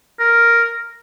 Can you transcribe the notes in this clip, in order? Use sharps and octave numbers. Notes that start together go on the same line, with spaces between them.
A#4